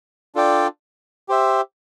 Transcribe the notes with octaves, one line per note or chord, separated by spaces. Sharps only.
D4 F4 A4 D5 G5
G4 C5 E5